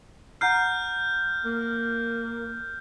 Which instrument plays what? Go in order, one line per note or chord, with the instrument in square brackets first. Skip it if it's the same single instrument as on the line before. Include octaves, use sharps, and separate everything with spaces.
[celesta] F#5 A#5 C7 [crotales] F6 G6
[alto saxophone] A#3